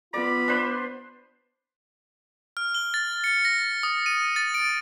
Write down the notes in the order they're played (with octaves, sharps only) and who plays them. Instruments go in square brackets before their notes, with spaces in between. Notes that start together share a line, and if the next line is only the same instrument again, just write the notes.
[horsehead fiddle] B3 [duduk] F4 [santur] D5 [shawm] B5
[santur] D4 B4 C5
[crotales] F6
G7
A6
C#7
A#6
D#6
D#7
A6
D7